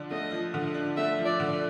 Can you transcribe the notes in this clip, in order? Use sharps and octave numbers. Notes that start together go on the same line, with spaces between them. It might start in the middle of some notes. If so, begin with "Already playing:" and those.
Already playing: D3 F3 D4
A3 D#5
F3
D3
D4
A3 E5
F3
D5
D3